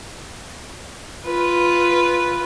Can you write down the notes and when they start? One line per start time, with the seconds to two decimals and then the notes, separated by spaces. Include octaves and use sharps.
1.25 F4 B4